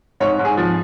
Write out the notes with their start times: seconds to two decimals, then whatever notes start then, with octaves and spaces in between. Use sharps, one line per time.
0.20 G#2 C#5
0.39 G#2
0.45 G#4
0.57 F3